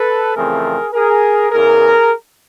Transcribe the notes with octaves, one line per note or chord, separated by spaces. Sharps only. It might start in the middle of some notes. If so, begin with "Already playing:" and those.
Already playing: A4 B4
F2 C#3 E3 A3 C4 G#4 A#4
G#4 A#4
E2 C#3 E3 G#4 A#4